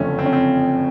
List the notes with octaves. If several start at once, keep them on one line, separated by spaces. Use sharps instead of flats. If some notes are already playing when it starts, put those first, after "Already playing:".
Already playing: F#1 F2 D3 F3 A3 C#4
C4
C#4
C4